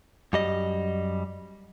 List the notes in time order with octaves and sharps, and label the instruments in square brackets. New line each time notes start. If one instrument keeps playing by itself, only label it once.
[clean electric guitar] F#2 G3 D#5